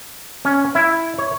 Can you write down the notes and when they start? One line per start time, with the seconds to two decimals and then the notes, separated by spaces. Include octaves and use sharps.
0.45 C#4
0.75 E4
1.18 C#5